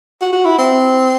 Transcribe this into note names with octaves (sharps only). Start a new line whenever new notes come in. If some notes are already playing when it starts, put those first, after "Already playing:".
F#4
F#4
E4
C4